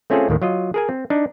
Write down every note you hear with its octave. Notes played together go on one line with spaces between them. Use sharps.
A3 C4 C#4 F4 G#4 A4
D#2 A2 D#3
F#3 F4 D#5
G#4 A#4 G#5
C4
D4 D#4